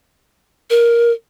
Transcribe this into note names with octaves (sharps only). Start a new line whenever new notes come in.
A#4